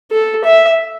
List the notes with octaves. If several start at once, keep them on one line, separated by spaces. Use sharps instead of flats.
A4
E5